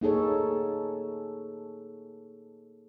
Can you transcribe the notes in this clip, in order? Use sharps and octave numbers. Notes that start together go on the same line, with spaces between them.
A#3 D#4 G#4 A4 C#5